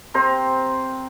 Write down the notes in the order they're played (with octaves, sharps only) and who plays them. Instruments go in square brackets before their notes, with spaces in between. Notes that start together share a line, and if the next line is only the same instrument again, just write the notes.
[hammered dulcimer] C3 C5 A#5 C6